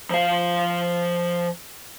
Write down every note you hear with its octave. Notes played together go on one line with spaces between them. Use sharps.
F3 F5